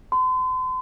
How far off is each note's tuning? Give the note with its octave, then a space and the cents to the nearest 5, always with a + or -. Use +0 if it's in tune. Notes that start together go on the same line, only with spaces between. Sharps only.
C6 -40